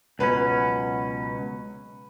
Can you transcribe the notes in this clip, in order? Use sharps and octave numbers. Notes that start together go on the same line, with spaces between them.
C#2 B2 F#3 C#4 B4